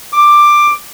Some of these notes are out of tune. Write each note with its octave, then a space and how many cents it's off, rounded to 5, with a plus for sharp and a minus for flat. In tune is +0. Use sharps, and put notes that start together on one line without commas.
D6 +10